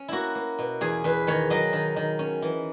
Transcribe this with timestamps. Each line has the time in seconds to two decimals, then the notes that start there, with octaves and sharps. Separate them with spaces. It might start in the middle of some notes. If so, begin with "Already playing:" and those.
Already playing: C#4
0.08 A#3 E4 F#4
0.35 A#3
0.59 B2
0.81 E2 G#4
1.04 E2 B4
1.27 D#3 C#5
1.50 F#3 D#5
1.73 D#3
1.96 D#3
2.19 C#4
2.42 E3